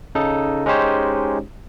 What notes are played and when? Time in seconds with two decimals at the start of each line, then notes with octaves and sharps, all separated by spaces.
0.15 C#3 D#4 A4
0.66 G#3 C#4 D#4 G4 C5 C#5